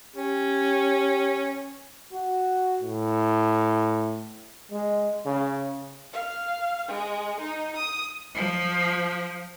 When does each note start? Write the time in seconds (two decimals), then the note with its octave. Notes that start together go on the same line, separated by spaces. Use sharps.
0.16 C#4 G4
2.13 F#4
2.82 A2
4.72 G#3
5.26 C#3
6.13 F5
6.88 G#3
7.40 D#4
7.76 D#6
8.35 F3